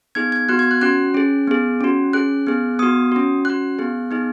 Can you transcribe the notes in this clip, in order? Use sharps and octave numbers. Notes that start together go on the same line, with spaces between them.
B3 D#4 G#4 G#6
G#6
B3 F#4 F#6
G#6
F#6
C#4 F#4 F#6
C#4 G#4
B3 G#4
C#4 F#4
C#4 G#4 F#6
B3 G#4
B3 F#4 D#6
C#4 F#4
C#4 F#4 F#6
B3 G#4
B3 D#4 G#4